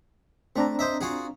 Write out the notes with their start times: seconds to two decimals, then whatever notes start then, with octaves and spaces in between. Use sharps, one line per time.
0.56 A3 C4 D4 A#5
0.79 C5 D#5 E5
1.01 F4 F#4 G#4